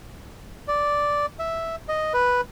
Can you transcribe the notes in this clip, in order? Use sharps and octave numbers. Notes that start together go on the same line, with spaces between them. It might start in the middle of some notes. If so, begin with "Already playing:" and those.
D5
E5
D#5
B4